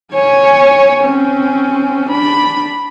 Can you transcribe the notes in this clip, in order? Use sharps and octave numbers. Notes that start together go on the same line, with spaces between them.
C#5 G#5
C4 C#4
D4 B5